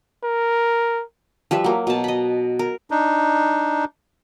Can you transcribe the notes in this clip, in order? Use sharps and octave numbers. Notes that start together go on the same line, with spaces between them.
A#4
F3 G3 B4 E5
F#3 A#3
B2 A5
D#5 B5
A#4
D4 D#4